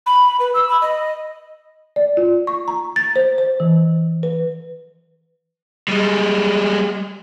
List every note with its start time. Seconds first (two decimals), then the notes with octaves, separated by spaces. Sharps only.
0.06 B5
0.40 B4
0.54 E6
0.69 B5
0.82 D#5
1.96 D5
2.17 F4
2.47 C#6
2.68 A#5
2.96 A6
3.16 C5
3.38 C5
3.60 E3
4.23 B4
5.88 G3 G#3